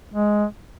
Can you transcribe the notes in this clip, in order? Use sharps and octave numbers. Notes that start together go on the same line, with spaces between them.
G#3